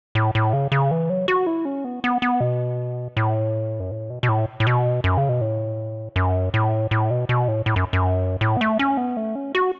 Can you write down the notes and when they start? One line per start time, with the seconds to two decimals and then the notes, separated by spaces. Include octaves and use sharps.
0.15 A2
0.35 A2
0.53 C#3
0.72 C#3
0.91 E3
1.10 F#3
1.28 F#4
1.47 E4
1.65 C#4
1.85 B3
2.04 B3
2.22 B3
2.41 B2
3.17 A2
3.80 F#2
3.91 A2
4.10 B2
4.23 B2
4.29 A2
4.60 A2
4.67 B2
5.04 F#2
5.17 C#3
5.29 B2
5.41 A2
6.16 F#2
6.54 A2
6.91 A2
7.10 B2
7.29 B2
7.48 A2
7.66 A2
7.76 F#2
7.93 F#2
8.41 A2
8.57 B3
8.61 A3
8.79 C#4
8.97 B3
9.17 A3
9.35 C#4
9.55 F#4